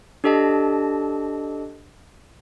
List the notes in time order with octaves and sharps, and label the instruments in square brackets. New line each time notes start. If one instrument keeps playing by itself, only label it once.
[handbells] D4 G4 A4 D#5 A5